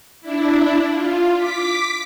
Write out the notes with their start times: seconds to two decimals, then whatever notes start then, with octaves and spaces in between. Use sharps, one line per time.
0.21 D4 E4
0.91 F4
1.36 D6 B6